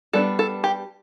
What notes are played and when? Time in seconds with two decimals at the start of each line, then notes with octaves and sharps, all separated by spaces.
0.13 G3 B3 D4 A4
0.39 A4
0.64 G4